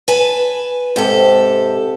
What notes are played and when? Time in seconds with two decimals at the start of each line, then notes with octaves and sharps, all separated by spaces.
0.08 B4 G#5 A5
0.96 G#2 C3 G4 A4